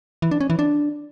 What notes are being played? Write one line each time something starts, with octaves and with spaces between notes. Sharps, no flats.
E3
D4
C#4
E3
D4